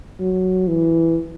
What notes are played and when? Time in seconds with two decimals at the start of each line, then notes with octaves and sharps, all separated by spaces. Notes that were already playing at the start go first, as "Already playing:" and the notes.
0.20 F#3
0.68 E3